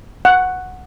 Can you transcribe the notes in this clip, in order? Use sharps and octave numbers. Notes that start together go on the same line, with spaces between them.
F#5